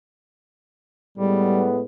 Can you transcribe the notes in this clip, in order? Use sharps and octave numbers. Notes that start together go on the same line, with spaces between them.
A2 G3 G#3 B3